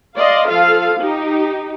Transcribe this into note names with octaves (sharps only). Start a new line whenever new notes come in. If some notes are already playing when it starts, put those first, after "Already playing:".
D5 D#5 F5 C6
F3 F4 A4 F5
D#4 G4